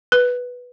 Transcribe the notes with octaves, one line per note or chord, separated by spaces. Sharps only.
B4